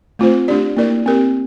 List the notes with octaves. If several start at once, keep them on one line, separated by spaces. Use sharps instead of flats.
A3 C4 F4 C5
A3 D4 G4 D5
A#3 E4 A#4 D5
C4 G4 A#4